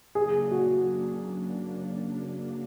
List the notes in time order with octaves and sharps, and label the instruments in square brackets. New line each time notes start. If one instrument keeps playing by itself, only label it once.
[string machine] F#2 C#3 F#3 A#3 D4 [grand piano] G#4
[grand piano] F#4